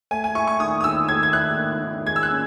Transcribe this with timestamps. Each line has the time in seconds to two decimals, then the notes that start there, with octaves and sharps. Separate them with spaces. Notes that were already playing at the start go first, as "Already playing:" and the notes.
0.11 A3 G#5
0.24 G#5
0.35 E4 C#6
0.47 C#6
0.60 D#3 D#6
0.81 D#6
0.84 D#3 E6
1.09 A3 G#6
1.23 G#6
1.33 E4 F#6
1.58 D#3
1.83 D#3
2.06 G#3 G#6
2.16 E6
2.23 F#6
2.31 C#4